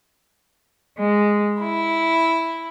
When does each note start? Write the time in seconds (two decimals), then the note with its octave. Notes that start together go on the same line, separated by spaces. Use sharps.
0.98 G#3
1.60 E4